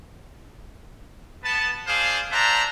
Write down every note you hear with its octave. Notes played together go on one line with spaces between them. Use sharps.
B3 A5
D4 G#4 C5 F5
C5 D5 E5 F#5 A5 A#5